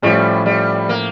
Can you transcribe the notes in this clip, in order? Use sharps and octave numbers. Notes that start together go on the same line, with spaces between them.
A2 F3 G3 C#4
G3
A#3